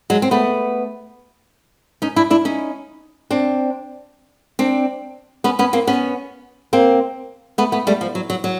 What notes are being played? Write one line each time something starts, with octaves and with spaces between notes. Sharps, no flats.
F#3 G#3
C4
A3 B3
C#4 D#4
D4 E4
D4 E4
C#4 D#4
C4 D4
C4 D4
B3 C#4
B3 C#4
A#3 C4
B3 C#4
A#3 C4
A3 B3
A3 B3
G3 A3
F3
F#3
F#3
F#3